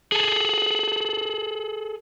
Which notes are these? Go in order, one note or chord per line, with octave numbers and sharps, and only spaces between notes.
G#4 A4